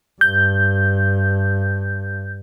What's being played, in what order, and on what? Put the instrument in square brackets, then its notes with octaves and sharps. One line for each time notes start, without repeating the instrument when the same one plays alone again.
[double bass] G2 [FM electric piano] G6